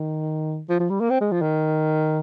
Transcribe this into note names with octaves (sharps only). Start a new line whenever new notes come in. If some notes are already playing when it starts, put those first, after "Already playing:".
Already playing: D#3
F3
F3
G3
A#3
C4
G#3
F3
D#3